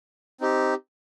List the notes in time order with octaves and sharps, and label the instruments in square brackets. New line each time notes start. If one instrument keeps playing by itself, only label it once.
[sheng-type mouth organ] C4 D#4 G4